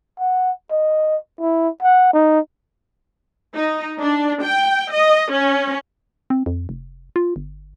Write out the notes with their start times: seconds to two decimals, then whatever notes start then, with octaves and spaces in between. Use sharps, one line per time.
0.19 F#5
0.71 D#5
1.40 E4
1.83 F#5
2.13 D#4
3.55 D#4
4.00 D4
4.43 G5
4.92 D#5
5.31 C#4
6.30 C4
6.46 F2
6.69 F1
7.16 F4
7.36 G1